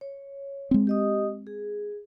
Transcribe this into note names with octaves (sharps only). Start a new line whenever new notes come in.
C#5
G#3 C4
G4 D#5 D#6
G#4